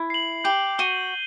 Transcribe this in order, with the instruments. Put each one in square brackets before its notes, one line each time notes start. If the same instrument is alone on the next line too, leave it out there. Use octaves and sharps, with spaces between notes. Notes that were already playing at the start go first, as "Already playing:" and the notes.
Already playing: [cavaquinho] E4
[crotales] C7 F#7
[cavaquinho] G4 [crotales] G6
[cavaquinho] F#4 [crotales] D#7 G7